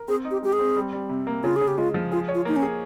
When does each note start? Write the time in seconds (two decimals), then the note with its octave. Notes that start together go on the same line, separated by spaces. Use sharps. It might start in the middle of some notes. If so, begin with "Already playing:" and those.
Already playing: A#4
0.08 C4 G#4
0.25 D#4
0.31 G4
0.42 G#3 G4
0.53 G#4
0.59 C4
0.76 G3
0.93 G3
1.09 C3
1.27 A#3
1.44 C#3 F4
1.56 G#4
1.61 C#3
1.68 G4
1.78 G#3 F4
1.94 F3
2.12 F4 G#4
2.28 C#5
2.34 F4
2.45 A#3 D#4
2.56 C#4
2.62 G#4